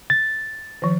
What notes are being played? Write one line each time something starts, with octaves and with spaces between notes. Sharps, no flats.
A6
D#3 F3